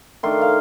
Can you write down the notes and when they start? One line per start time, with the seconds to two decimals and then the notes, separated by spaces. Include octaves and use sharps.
0.23 D#3 A3 D4 F4 C6
0.42 F5